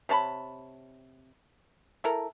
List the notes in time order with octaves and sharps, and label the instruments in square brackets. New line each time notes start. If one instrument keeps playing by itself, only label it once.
[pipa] C3 C#5 A5 B5
E4 A4 A#4